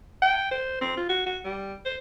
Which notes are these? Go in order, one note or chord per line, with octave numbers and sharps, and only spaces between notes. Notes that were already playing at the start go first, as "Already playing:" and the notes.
G5
C5
C4
F4
F#4
F#4
G3
C5